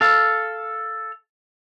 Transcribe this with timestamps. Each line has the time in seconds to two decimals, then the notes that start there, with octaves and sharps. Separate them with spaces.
0.01 A4 F5